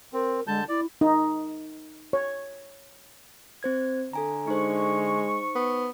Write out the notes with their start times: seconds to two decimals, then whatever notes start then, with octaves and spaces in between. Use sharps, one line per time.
0.13 C4 A#4
0.47 D3 G#3 A5 G6
0.69 E4 D5
1.01 D#4
2.13 C#5
3.63 C4 C5 G#6
4.13 D3 A4 G#5 A#5
4.48 G#3 D#4 C5 C#6
5.56 B3